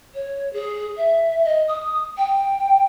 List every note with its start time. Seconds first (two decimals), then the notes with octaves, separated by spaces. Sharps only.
0.14 C#5
0.53 G#4
0.97 E5
1.44 D#5
1.68 D#6
2.17 G5